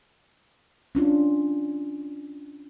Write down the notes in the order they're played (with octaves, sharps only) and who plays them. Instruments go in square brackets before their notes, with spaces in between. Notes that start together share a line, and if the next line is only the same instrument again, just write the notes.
[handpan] C#4 D4 F4